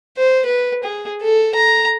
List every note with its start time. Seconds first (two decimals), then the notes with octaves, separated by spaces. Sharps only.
0.17 C5
0.46 B4
0.84 G#4
1.23 A4
1.55 A#5